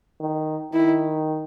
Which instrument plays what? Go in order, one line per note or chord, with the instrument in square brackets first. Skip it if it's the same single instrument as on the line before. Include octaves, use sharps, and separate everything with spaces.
[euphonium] D#3
[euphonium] D#3 [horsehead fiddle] E4